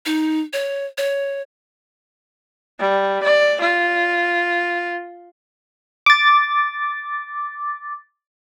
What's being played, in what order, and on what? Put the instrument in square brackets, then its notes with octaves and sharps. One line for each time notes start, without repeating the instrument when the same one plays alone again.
[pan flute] D#4
C#5
C#5
[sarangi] G3
D5
F4
[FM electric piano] D6 A6